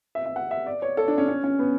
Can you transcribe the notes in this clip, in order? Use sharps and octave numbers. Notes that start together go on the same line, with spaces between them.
E5
E5
F#5
E5
D5
C#5
A4
D4
C#4
C#4
C#4
B3